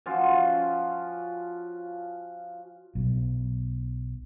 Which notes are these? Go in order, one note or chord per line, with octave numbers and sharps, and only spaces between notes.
F3 C#4 F4 F#4
B1